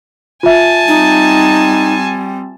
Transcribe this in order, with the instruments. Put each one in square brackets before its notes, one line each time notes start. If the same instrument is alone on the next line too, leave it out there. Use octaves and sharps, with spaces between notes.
[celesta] F4 E5 [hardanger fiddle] G#5 A5
[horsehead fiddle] G3 C4 [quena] D#4